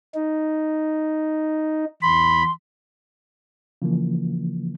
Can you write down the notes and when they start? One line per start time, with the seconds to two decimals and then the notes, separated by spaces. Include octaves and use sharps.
0.15 D#4
2.02 E2 B5 C6
3.82 C#3 E3 F3 A#3